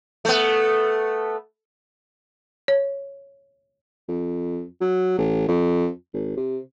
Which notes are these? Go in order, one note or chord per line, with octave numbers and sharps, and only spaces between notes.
A3 B3
C#5
F2
F#3
A1
F2
G#1
C3